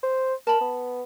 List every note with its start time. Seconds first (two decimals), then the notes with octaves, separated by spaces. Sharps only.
0.03 C5
0.47 A#4 A5 B5
0.61 B3